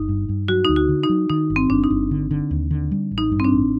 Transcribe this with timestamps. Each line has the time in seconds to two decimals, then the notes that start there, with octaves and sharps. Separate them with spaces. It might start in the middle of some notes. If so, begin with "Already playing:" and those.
Already playing: G1 D#4
0.09 G2
0.29 G2
0.48 F#3 F#4
0.65 D2 D#4
0.76 F#4
0.89 D3
1.03 D#4
1.09 F#3
1.29 D#3 D#4
1.50 G1
1.56 C4
1.70 G1 D4
1.84 D#4
1.90 G1
2.11 D3
2.31 D3
2.51 D#2
2.71 D3
2.91 G3
3.11 A1
3.18 D#4
3.32 G2
3.40 C4
3.44 D4
3.52 A1